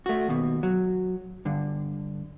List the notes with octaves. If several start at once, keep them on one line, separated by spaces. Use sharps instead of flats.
A3 F#4
D#2 B2
F#3
G2 D3